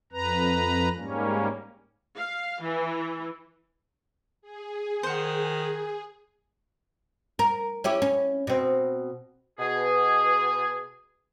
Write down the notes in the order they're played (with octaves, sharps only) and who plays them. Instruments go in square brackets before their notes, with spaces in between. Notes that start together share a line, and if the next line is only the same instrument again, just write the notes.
[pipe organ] F2 B4 A#5
G#2 G3 A#3 C#4
[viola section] F5
E3
[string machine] G#4
[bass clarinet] D#3 [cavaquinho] C5 F#5
[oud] A#4
C#4 E4 G4
C#4
B2 C4
[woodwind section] B2 G#4